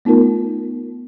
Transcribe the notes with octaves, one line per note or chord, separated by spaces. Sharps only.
A3 B3 D#4 F4 A#4